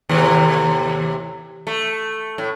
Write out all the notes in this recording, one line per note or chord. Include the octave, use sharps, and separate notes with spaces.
D#2 A2 C3
A3
A2